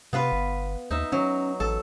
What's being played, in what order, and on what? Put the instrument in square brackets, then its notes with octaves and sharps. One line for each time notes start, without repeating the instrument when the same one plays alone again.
[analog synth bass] C3 [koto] B3 F4 B4
[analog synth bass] G1
[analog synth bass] D#2 [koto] D#4 E5
[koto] F#3 [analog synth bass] C#4
[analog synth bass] A1 [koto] A4